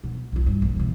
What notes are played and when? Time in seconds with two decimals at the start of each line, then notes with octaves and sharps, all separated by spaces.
0.04 B2
0.32 B1 F4
0.46 G2
0.62 A#1
0.76 B2 E3